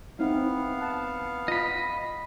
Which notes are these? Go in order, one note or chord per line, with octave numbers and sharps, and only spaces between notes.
B3 C4 D#4 E4 F5
F#5 A5
F4 D#5 B5